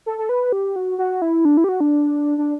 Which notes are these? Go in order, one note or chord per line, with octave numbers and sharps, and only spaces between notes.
A4
A4
B4
G4
F#4
F#4
E4
D4
E4
G4
F#4
D4
D4